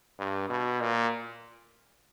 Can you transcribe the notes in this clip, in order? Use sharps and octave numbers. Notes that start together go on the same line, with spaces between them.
G2
B2
A#2